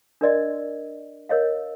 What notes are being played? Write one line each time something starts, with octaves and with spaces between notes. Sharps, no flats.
D4 A#4 D5 D#5
A#4 C#5 D#5 F5